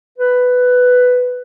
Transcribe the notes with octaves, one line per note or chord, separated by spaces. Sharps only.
B4